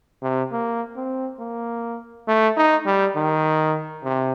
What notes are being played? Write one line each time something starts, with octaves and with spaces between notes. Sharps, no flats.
C3
A#3
C4
A#3
A3
D#4
G3
D#3
C3